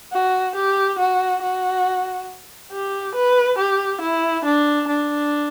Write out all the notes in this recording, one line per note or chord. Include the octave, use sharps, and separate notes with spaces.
F#4
G4
F#4
F#4
G4
B4
G4
E4
D4
D4